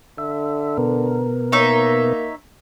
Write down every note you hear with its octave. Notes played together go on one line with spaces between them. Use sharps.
D3 E5
B2 B3 A#4
A#3 D#4 C#5 E5